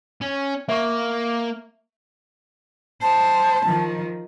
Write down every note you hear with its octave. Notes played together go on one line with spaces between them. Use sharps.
C#4
A#3 E5 C#6
C5 A5
D#3 F3